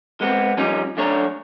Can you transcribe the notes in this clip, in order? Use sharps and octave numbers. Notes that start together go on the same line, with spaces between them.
G#3 B3 C4
F3 G3 C#4 D#4
F#2 A3 D4 C#5 A#5